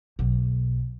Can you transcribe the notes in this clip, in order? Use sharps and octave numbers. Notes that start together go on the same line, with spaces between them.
B1